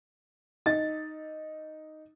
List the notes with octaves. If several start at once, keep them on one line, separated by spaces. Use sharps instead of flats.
D#4 A6